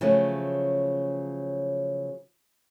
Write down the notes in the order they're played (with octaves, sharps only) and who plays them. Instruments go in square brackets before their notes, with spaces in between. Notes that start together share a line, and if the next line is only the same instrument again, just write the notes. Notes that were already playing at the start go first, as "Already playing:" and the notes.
[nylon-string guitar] C#3 F3 F#3 A3